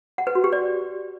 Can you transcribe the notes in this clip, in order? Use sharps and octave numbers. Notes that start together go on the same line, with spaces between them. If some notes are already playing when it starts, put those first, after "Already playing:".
F#5
B4
F#4
G4
D5